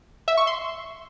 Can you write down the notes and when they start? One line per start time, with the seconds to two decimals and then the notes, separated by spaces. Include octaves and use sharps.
0.28 E5
0.37 C#6
0.47 C6